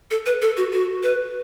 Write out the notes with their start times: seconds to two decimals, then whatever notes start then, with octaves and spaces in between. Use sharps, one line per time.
0.11 A4
0.26 B4
0.42 A4
0.57 F#4
0.73 F#4
1.03 B4